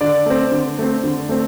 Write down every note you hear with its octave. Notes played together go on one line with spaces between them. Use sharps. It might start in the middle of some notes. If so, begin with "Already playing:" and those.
D3 D5
A3 C4
D3
A3 C4
D3
A3 C4